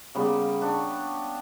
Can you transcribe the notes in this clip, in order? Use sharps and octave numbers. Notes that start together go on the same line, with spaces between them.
C#3 G3 A#3 B3
D4 C#6